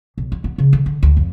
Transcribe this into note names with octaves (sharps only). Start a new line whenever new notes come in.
B1
E4
B3
C#3
D3
D3
D2
F2